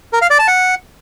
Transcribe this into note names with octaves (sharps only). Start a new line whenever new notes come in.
A#4
F5
D5
A5
F#5